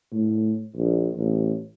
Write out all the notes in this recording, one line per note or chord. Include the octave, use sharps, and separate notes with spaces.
A2
A#1
A1